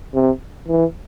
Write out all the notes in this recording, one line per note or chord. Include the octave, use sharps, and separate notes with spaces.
C3
E3